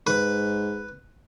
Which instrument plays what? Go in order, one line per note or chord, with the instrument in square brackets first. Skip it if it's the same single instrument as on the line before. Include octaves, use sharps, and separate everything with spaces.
[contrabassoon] G#2 [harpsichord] B4